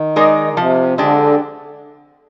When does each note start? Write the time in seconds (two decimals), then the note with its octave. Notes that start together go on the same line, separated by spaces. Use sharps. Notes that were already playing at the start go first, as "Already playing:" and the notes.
Already playing: D#3
0.16 G#3 D#4 A#4 D5
0.52 D3
0.57 C3 F3
0.98 D3 G#3 D4 G4